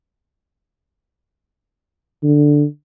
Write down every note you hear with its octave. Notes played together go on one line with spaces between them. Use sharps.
D3